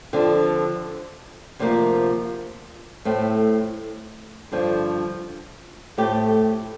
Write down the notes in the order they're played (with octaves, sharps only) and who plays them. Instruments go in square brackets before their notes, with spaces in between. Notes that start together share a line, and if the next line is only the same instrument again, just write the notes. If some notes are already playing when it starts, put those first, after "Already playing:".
[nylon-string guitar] F2 D3 F3
D2 C3 F3 A#3
A2 A3 C4
G2 D3 F3
A2 A3 C4 G4